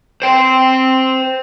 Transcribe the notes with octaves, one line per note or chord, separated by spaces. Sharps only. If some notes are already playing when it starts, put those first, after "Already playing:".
C5 G5